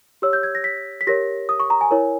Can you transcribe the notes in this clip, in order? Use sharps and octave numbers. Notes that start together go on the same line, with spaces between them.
G4 C#5 E6
G6
G#6
A#6
B6
B6
G4 A#4 C#5 A#6
D#6
C#6
A#5
G#5
E4 A#4 C#5